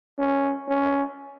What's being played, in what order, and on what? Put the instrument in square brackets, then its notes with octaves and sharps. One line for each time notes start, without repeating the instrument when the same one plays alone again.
[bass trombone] C#4
C#4